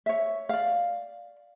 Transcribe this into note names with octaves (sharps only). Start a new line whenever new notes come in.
C#5 E5
D5 F5